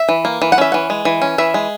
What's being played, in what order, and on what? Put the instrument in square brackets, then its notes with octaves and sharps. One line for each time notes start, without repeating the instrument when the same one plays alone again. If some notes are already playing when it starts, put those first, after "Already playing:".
Already playing: [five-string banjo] E5
E3
A#3
E3
F#5
C#4 E5
E3 F#5
G#3
E3
C#4
E3 E5
G#3